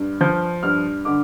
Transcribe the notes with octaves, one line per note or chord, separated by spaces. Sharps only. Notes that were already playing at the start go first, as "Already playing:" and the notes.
Already playing: G2
F3 G6
G2 F6
D3 D6